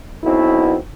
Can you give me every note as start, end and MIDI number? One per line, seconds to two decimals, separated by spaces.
0.23 0.75 35
0.23 0.75 47
0.23 0.75 60
0.23 0.75 64